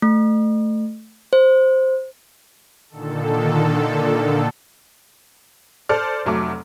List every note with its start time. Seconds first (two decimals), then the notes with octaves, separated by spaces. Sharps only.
0.02 A3
1.33 C5
2.90 A#2 D3 D#3 A4
5.89 A4 C5 D5 F6
6.25 F1 F#3 A3 D6